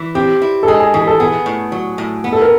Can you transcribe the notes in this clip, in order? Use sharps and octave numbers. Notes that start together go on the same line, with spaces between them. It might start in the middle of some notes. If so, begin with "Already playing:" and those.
Already playing: E3
C4 G4
E4
A4
G#3 G#4
G#4
E3 G#4
A4
B3 G#4
A2
F#3
A2
B3
A4
A#4